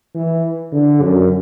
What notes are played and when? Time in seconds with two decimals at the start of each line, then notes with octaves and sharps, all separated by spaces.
0.15 E3
0.72 D3
1.02 F#2